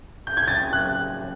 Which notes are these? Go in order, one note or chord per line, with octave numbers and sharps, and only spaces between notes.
G6
G#6
A6
F#6